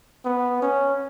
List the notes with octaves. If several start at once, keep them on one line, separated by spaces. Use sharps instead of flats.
B3
C#4